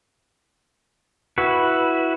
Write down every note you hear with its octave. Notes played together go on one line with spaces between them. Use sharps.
E4 F#4 B4